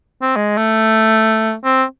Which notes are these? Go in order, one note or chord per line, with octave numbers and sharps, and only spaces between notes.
C4
G#3
A3
C4